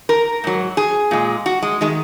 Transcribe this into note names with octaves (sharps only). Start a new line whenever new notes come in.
A#4
G#2 F#3
G#4
A#2 G#3
F#4
G#3
D#3 G#3